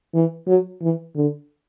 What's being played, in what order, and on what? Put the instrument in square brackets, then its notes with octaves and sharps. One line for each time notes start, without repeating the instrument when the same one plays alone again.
[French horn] E3
F#3
E3
D3